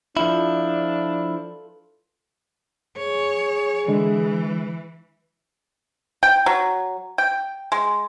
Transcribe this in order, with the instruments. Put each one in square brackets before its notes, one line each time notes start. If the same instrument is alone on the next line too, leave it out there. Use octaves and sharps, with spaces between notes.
[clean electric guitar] F3 E4 [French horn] D4 [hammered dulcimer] F4 A4 B4
[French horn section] G#4 [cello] C#5
[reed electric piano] D3 G#3 [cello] E3
[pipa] G5
F#3
G5
G#3